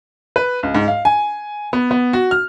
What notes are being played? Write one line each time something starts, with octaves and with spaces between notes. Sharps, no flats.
B4
C#2
G#2
F5
G#5
B3
B3
F#4
F6